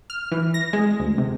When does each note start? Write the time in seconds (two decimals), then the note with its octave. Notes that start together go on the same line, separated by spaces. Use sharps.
0.10 F6
0.32 E3
0.54 A#6
0.73 G#3
1.00 D2
1.18 C3